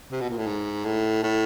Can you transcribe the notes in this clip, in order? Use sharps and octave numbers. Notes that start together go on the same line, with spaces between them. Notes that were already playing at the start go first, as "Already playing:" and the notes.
C3
B2
A#2
A2
G#2
A2
A2